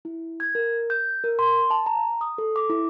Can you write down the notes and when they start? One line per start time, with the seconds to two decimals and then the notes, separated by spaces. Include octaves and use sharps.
0.05 E4
0.40 G#6
0.55 A#4
0.90 G6
1.24 A#4
1.39 C6
1.70 A5
1.86 A#5
2.21 D#6
2.38 A4
2.56 D6
2.70 E4